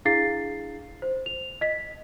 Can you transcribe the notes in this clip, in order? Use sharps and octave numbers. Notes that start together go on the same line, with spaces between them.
D4 E4 G#4 F5 A6 C7
C5
F7
D#5 B6